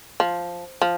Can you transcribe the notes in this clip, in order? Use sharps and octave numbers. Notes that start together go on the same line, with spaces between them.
F3
F3